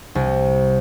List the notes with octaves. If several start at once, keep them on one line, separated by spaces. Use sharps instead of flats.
C2